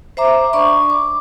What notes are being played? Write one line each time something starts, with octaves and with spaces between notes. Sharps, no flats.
C5 E5 A#5 D6
D4 D5 B5 C#6
D6